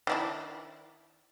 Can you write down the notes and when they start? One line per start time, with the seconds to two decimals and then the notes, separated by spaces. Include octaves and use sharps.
0.07 D#3 D4 E4